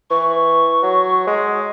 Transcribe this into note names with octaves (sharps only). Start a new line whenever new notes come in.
E3 C#6
F#3
G#3